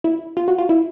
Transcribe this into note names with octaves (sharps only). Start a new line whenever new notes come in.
E4
F4
F#4
F4
E4